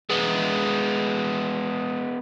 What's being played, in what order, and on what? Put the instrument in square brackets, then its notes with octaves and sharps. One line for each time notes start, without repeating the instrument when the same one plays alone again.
[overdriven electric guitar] G#3 B3